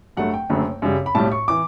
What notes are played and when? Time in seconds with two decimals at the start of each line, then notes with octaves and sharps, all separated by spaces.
0.17 G2 F#3 A3 F#5
0.34 G5
0.49 F#1 F#2 D3 F#3 A3
0.82 F#2 C#3 G3
1.06 B5
1.15 B1 A2 G3 A5
1.32 C#6
1.48 E3 D6